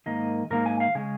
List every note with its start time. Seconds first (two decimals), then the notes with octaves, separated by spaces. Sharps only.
0.06 G#2 D#3 A#3 D#5
0.50 G#2 D#3 A#3 A#4
0.66 G#5
0.80 F5
0.95 C#3 G#3 C#4 G#4